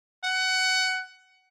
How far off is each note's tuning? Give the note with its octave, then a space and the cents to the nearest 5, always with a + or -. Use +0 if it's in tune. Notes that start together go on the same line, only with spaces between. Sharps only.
F#5 +20